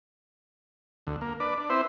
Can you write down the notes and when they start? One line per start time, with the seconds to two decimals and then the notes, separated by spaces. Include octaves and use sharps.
1.07 D2
1.21 A#3
1.40 D4 B4 D5
1.58 D4
1.70 C4 E4 B4 C5